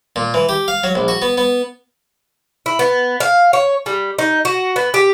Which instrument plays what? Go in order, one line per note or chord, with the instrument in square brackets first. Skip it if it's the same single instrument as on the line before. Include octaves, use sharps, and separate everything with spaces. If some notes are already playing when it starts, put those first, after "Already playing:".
[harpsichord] A#2
E3
G4
F5
F#3
A#1
F#4
B3
B3
[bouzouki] E4
B3
F5
C#5
G3
D#4
F#4
B3
G4